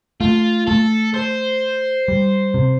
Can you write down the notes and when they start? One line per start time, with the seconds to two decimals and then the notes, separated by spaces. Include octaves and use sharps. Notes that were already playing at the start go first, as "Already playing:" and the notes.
0.21 A3 F4
0.67 A3 A4
1.14 C5
2.08 G3
2.54 C3